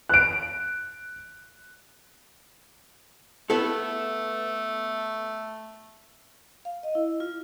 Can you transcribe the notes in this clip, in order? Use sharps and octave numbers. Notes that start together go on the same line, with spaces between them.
F#6 D7
A3 B3 E4 A4
F5
D#5
E4
F4